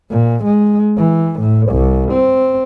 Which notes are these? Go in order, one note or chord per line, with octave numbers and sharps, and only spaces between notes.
A#2
G#3
E3
A2
C2
C4